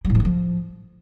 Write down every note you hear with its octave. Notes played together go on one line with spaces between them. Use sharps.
G3
A2
F3
D3
F3